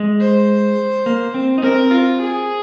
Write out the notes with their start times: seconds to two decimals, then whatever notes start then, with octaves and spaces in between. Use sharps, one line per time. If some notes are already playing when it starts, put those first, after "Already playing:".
Already playing: G#3
0.21 C5
1.06 A#3
1.34 C4
1.58 D#4
1.63 C4 A#4
1.91 F4
2.21 G#4